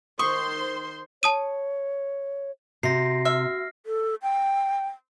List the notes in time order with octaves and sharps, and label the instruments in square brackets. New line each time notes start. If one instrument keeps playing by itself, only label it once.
[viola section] D#3 C5 C6 [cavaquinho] C#6 [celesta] D#6
[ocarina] C#5 [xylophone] A5 D#6 D#7
[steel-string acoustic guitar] C3 [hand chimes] F#4 [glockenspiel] A#6 C7
[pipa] E5 [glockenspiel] F6
[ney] A4
G5